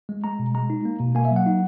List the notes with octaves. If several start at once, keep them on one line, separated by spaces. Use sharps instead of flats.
G#3
G#3 A#5
B2
G#3 A#5
D#4
A#3
B2
A#3 G#5
E5
F#3
F#5
D#4